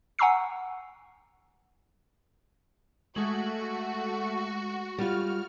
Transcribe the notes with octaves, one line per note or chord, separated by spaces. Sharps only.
F#5 G#5 A#5 C#6 E6 C7
G#3 A3 F#4 F#7
G3 F4 F6